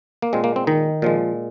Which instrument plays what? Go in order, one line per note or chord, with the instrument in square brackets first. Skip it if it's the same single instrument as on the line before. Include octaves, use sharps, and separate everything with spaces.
[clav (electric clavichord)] A#3
A#2 G#3 C4
A#3
C4
D#3 D#4
A#2 F3 G#3